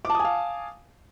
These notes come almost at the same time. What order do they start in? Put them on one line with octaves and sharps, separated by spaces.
D6 A5 D#6 G#5 F5